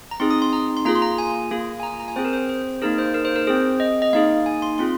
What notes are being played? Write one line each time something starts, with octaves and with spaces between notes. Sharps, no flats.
A#5
C4 D#4 G#4 C6
D#6
C6
A#5
C6
A#3 F4 G#4 A#5
C6
A#5
G#5
A#3 F4 G#4
G#5
A#5
A#5
G#5
C4 G#4 C5
A#4
C5
C5
A#3 D#4 G#4 A#4
C5
A#4
C5
A#4
C4 G#4 C5
D#5
D#5
A#3 D#4 G#4 F5
G#5
C6
C4 F4 G#4 C6